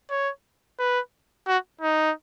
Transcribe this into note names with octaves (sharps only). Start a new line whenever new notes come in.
C#5
B4
F#4
D#4